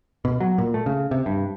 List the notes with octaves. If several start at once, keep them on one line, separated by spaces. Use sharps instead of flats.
B2
F#3
A#2
A3
C#3
C3
G2